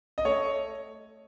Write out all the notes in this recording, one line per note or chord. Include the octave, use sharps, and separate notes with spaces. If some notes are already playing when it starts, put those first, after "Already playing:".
D#5
A3 C#5